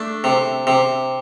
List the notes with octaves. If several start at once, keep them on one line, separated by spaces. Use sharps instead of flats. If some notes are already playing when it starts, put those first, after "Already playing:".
Already playing: A3 D4
C3
C3